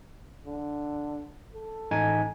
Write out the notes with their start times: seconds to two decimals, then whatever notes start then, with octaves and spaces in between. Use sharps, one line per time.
0.46 D3
1.54 A4
1.91 A1 D#4 G#5